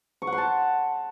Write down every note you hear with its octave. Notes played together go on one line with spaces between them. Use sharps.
C#6
F#5
C6
A5